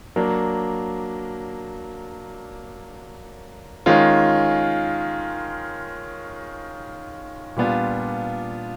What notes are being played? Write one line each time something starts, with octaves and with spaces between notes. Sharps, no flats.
F#3 A#3 D4
D#3 G#3 C#4 F4
A#2 G3 B3 D4 F4